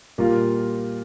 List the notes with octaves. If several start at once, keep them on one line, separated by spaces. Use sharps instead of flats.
A#2 G3 A#3 F4